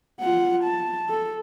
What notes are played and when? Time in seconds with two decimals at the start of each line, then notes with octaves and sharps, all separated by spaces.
0.21 F4 F#5
0.64 A5
1.09 A4